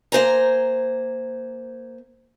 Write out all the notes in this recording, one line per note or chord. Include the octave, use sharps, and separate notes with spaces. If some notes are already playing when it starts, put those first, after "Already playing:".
A#3 C5 G#5 A#5